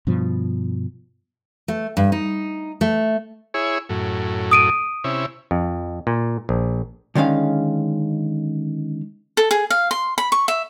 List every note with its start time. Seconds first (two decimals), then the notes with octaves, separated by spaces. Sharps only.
0.07 G2 B2 F3
1.68 A3
1.97 G2
2.12 D#4
2.81 A3
3.54 E4 G#4 C#5
3.89 F#2 A2
4.51 D#6 D7 D#7
5.04 C3 C#4 E4
5.51 F2
6.07 A#2
6.49 A#1
7.15 D3 D#3 G#3 C#4 F5
9.37 A4
9.51 G#4
9.71 F5
9.91 C6
10.18 B5
10.32 C#6
10.48 E5